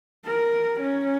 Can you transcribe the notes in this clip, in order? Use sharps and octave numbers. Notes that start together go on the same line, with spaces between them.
A#4
C#4